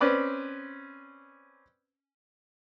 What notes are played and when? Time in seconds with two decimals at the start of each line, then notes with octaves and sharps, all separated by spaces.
0.01 C4 C#4 B4 D5 B5